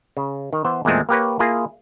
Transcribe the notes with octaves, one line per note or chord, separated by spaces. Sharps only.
C#3
D#3
E3 B3 C5
E2 A#2 G#3 A3 C4
A#3 G4 B4 C#5
A#3 E4 F4 G#4